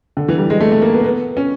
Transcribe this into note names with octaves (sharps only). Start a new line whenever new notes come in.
D3
E3
G3
G#3
A3
A3
A#3
B3
A#3
B3
C#4